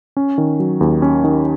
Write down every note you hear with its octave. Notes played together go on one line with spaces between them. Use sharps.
C#4
D#3
F#3
D#2
C#4
D#3